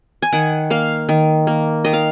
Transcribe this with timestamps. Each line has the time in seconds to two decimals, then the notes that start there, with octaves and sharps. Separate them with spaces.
0.22 G#5
0.33 D#3 F#5
0.70 A#3 F5
1.09 D#3
1.47 A#3
1.85 D#3 D#5
1.93 F5